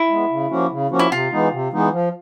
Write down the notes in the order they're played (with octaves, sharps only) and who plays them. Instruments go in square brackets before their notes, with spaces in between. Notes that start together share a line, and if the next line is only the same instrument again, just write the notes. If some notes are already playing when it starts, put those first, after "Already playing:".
Already playing: [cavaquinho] E4
[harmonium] G#3 B3
C#3
F3 A#3 C#4 F#4
C#3
F3 A#3 C#4 F#4
[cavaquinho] E4
[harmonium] C3 [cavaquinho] F4
[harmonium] E3 G#3 B3 D#4
C3
E3 G#3 B3 D#4
F3